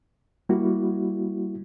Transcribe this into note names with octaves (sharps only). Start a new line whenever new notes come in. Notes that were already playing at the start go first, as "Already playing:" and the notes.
G3 A#3 E4 F#4